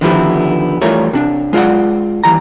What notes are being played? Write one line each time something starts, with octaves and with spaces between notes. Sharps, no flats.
D3 D#3 F3 B3 E4 G4
E3 G3 A3 F4 A#4 C#5
C3 D4
G#3 F4 D5 F#5
D#2 E3 G3 A#5